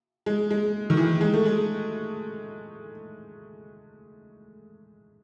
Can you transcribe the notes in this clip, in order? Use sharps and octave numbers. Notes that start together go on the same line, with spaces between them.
G#3
G#3
D#3
E3
G#3
A3
G#3